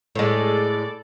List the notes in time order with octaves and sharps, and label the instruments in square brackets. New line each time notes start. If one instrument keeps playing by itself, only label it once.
[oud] A2 G#3 [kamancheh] A4 D5